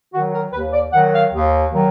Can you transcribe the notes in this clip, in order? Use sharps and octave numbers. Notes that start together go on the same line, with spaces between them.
D#3 F#3 F#4
A#4
D#2 B4
D5
D#3 F#3 F#5
F5
D#2
D#3 F#3